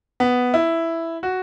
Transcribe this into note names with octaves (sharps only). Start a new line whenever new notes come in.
B3
E4
F#4